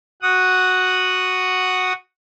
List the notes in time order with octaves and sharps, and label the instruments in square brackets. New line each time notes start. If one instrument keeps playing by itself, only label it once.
[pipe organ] F#4 F#5 D#6